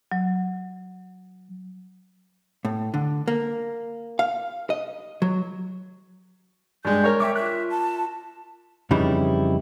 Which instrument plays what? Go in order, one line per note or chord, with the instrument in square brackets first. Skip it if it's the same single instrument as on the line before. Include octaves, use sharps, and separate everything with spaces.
[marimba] F#3
[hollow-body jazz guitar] A2
D3
A#3
F5
D#5
F#3
[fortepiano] G2 G#3 [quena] G6
[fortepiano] A#4 C#5
[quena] E5 [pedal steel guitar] G5 C#6 D6
[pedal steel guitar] F4 F#6 [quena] E5
[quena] A5
[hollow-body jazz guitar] F2 C#3 E3 G3 D#4 E4